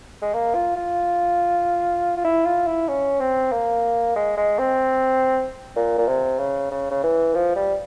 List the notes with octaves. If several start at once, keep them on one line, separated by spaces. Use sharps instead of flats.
G#3
A#3
F4
F4
F4
E4
F4
E4
C#4
C4
A#3
G#3
G#3
C4
A#2
A#2
C3
C#3
C#3
C#3
E3
F3
G3